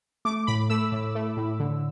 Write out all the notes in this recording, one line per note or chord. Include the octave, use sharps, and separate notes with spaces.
A3 D6
A2 B5
A3 E6
A2
A3
A2
D3